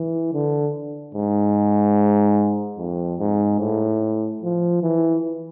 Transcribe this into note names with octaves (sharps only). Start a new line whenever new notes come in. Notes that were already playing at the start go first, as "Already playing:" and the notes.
Already playing: E3
D3
G#2
F2
G#2
A2
F3
E3